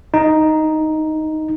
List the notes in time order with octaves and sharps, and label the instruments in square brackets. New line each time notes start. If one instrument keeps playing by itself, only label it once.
[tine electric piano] D#4